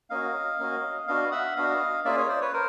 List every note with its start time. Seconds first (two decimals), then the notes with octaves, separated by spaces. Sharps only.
0.10 A#3 C#4 F#4 D#5 F5
0.59 A#3 C#4 F#4
1.07 B3 D4 F#4 D#5 F5
1.31 E5 F#5
1.56 B3 D4 F#4 D#5 F5
2.05 A#3 C#4 F4 G#4 D5 E5
2.17 C#5 D#5
2.29 C5 D5
2.41 B4 C#5
2.53 A#4 C5